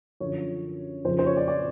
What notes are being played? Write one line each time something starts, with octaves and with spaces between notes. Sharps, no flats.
F#2 D3 F3 C#5
F2 C#3 F3 C5
C5
C#5
D5
D5